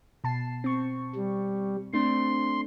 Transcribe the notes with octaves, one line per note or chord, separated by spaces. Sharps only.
B2 A5 C7
C4 C#6
G3
A3 C4 D4 C6